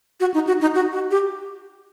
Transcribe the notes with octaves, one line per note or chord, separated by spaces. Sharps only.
F#4
D#4
F#4
D#4
F#4
F#4
G4